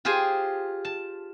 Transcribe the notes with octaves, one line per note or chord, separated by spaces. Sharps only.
F4 G4 G#4 C5 G#5
A5